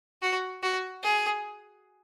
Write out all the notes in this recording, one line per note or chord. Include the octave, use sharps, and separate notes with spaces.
F#4
F#4
G#4